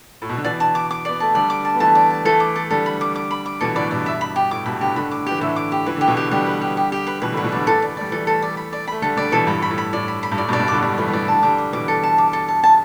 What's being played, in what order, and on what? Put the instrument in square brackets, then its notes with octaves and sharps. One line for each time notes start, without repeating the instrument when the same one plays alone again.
[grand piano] A2
B2
D3
[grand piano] B2 E3 [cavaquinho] D5
[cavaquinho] A5
D6
D6
[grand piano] B3 [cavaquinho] D5
[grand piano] A3 [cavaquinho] A5
[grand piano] D3 G3 [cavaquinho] D5
[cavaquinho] D6
A5
[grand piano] B3
[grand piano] E3 A3 [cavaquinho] A5
[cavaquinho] D5
A5
[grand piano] E3 A3 [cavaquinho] A4
[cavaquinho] D6
A4
[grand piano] D3 G3 [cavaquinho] A4
[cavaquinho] B5
D6
D6
B5
D6
[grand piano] B2 E3 [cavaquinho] A4
[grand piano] A2 D3 [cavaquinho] D5
[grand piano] G2 B2 [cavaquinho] D5
[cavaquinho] E5
B5
G4
[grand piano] A2 [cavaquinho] D6
[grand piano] G2 B2 [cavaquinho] B5
[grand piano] A2 D3 [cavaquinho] G4
[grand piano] A2 D3 [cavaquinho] B5
[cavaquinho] D6
[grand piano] E3 [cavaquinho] G4
[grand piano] A2 D3 [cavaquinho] E5
[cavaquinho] D6
G4
[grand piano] E3 [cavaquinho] B4
[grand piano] D3 [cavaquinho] G4
[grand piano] B2 E3
[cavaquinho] G4
[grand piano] D3 G3 [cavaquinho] G4
[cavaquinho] B4
G4
G4
G4
B4
[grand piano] B2 E3 [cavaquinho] B4
[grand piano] A2 D3
[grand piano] G3 [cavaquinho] B4
[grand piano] B2 E3
[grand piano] D3 G3 [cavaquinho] D5
[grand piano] E3 A3 [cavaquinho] A4
[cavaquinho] D5
[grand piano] G3 [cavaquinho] D5
[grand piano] E3 A3 [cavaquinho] A4
[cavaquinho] A4
D5
B5
D5
[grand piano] A3 [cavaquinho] B5
[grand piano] D3 G3 [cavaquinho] A4
[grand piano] D3 G3 [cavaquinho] D5
[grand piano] B2 E3 [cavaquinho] A4
[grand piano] G2 [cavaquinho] B5
[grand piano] A2
[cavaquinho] B5
[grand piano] A2
[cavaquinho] B5
[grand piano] A2 [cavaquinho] D5
[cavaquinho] B5
B5
[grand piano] G2
[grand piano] A2 [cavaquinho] D5
[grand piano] G2 B2
[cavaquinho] D5
[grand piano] G2 B2
[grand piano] A2 D3 [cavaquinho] D6
[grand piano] D3 G3 [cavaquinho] D5
[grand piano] G3
[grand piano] E3 A3 [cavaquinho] D5
[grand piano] G3
[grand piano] E3 A3 [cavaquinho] D5
[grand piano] D3 G3 [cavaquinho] A5
[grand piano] D3 G3 [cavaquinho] D6
[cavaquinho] D6
[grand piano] B2 E3 [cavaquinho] D6
[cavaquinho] A4
A5
D6
A4
A5
A5